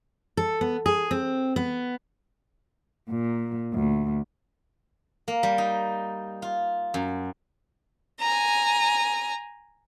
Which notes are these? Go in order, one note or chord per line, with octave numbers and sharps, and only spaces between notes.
A4
B3
G#4
C4
B3
A#2
D2
A#3
G3
D#4
F4
F#2
G#5 A#5